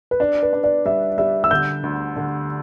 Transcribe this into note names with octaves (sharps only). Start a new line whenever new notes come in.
B4
D4 D5
B4
D4
D5
G3 E5
G3 E5
E6
D3 G6
D2
D3